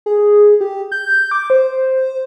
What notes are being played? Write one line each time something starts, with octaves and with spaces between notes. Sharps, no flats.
G#4
G4
G6
D6
C5